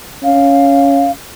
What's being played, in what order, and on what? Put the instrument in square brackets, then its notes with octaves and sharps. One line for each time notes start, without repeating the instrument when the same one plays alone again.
[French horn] C#4 [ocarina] F5